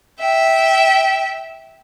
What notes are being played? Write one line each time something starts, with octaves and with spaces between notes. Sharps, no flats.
E5 G5